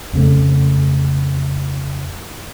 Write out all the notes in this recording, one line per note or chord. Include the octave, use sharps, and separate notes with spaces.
F2 C#3 A3